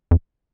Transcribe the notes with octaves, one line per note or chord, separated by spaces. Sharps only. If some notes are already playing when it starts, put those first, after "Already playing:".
F2